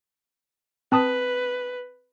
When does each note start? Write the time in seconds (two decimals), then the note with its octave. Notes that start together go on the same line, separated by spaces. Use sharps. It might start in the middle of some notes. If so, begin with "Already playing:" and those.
0.92 C4 B4 A5 D#6